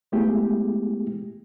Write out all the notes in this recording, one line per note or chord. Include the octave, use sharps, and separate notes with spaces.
G#3 A3 B3 E4 G4 G#4